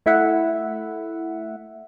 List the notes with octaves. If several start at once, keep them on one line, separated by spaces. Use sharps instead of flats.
A3 E4 E5 F#5